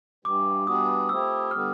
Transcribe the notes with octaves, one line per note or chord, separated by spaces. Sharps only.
G2 E3 G3 D6
E3 G3 B3 D4 F#4 D#6
F3 A3 C4 E4 G4 E6
D3 G3 B3 F6